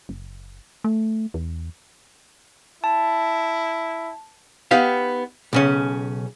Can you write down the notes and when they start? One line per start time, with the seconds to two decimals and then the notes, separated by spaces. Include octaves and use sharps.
0.09 F#1
0.84 A3
1.34 E2
2.84 E4 A5
4.71 B3 D#4 G4 F5
5.53 B1 C#3 C#4